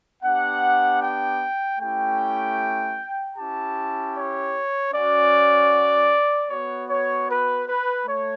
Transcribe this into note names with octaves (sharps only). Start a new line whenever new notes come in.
B3 D4 G4 F#5
G5
A3 C#4 E4 G4 G5
C#4 E4 G4 A5
C#5
C#4 F#4 D5
B3 F#4 C#5
C#5
B4
B4
A3 C#5